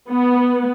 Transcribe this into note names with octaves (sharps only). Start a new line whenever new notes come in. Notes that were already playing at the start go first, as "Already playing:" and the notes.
B3